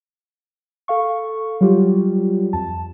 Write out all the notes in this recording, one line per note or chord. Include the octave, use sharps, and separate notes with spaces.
A4 F5 C#6
F#3 G3 F4 G4
F2 A5